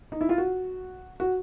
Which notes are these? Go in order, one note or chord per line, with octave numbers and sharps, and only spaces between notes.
D#4
E4
F4
F#4
F#4